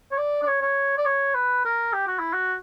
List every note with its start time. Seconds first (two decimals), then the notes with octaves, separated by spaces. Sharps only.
0.12 C#5
0.18 D5
0.42 D5
0.47 C#5
0.62 C#5
0.98 D5
1.05 C#5
1.35 B4
1.65 A#4
1.93 G4
2.07 F#4
2.19 E4
2.33 F#4